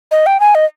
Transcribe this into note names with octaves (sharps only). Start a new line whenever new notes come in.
D#5
G5
G#5
D#5